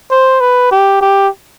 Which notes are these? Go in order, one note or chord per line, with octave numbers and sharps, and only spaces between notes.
C5
B4
G4
G4